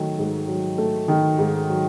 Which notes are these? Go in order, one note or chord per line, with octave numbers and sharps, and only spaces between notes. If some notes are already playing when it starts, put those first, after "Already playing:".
Already playing: D#3 F#3 A3
G#2
F#3
A3
D#3
G#2
F#3